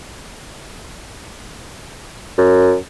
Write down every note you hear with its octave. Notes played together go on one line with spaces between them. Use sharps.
F#2